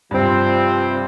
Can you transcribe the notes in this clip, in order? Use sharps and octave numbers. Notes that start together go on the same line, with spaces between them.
G2 C3 F3 C4